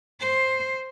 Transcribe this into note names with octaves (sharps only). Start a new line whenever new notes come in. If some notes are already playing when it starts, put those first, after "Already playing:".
C5